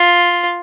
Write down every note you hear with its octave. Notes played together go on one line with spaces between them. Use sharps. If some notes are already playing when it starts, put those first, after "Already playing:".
Already playing: F4